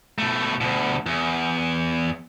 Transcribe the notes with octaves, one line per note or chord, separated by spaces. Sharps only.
B2 A3
D2 B2
E2